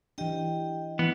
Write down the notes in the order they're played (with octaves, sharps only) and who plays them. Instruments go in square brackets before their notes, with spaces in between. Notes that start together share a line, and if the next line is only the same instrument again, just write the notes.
[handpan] E3 D4 [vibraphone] G4 D#5 G5
[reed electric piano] E3 [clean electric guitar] B3